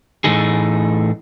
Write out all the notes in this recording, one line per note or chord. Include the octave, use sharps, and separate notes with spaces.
A2 E3 F#3 A3 D#4 G#4